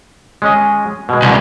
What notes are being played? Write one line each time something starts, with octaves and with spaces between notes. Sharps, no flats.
G#3 C#4 D#5
B2 G#3
C2